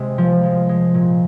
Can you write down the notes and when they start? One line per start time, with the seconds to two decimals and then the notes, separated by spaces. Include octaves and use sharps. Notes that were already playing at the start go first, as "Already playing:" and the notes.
Already playing: C3 G#3
0.18 F3
0.43 G#3
0.69 G#3
0.94 A#2